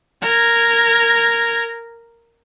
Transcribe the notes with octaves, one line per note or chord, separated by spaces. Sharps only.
A#4 G#6